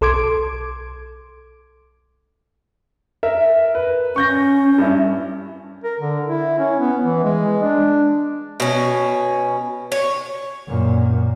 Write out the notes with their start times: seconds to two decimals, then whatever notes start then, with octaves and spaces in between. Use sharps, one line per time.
0.01 B1 A4 C6 D6 G#6 D7
3.23 A#4 E5
3.75 B4
4.16 C#4 C#6 G6 A#6
4.78 G2 E4
5.84 A#4
6.00 D3
6.27 E4
6.58 C#4
6.80 B3
7.04 E3
7.24 G#3
7.63 D4
8.60 B2 C#4
9.92 C#5
10.68 F#2 A#2